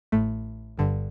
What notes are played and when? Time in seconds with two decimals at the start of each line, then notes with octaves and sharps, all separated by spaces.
0.12 A1 A2 A3
0.77 G1 G2 D3